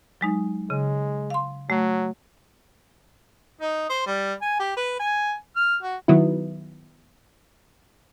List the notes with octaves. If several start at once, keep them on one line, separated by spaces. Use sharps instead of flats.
F#3 G#3 D#4
C#3 G#3
F5 C6
F#3 A3
D#4
C5
G3
G#5
G4
B4
G#5
F6
F#4
D#3 F#3 B3 E4